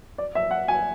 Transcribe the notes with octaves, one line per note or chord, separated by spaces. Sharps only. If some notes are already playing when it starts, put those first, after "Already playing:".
D5
E5
F#5
G#5